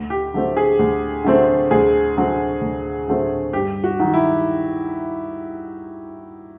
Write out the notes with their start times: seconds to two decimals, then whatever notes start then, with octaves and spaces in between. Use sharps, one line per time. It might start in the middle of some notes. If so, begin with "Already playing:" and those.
Already playing: D2
0.10 G4
0.34 D3 F#3 A3 C4
0.57 G#4
0.79 D2
1.25 D3 F#3 A3 C4
1.71 D2 G#4
2.17 D3 F#3 A3 C4
2.61 D2
3.08 D3 F#3 A3 C4
3.53 G2 G4
3.84 F#4
4.00 D#3 F#3
4.14 E4